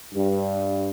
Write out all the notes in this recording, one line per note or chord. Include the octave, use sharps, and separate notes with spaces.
G2